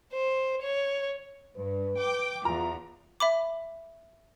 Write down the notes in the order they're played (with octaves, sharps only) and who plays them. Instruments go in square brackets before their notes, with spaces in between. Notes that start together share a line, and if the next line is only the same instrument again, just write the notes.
[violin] C5
C#5
[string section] G2 [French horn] B4
[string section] G5 D6
[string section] E2 [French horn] F4 [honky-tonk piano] A#5
[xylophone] E5 B5 D6